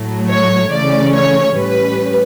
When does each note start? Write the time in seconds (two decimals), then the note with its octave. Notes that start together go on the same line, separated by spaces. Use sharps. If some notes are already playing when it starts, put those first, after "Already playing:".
Already playing: A2 F#3 A3
0.28 C#5
0.71 C#3 E3 A3 C#4 D5
1.13 C#5
1.56 A2 G3 C#4 B4